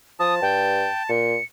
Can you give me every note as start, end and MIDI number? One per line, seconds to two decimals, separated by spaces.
0.20 0.41 53
0.20 1.10 81
0.20 0.35 87
0.42 0.87 43
0.42 1.03 79
1.09 1.36 46
1.09 1.44 97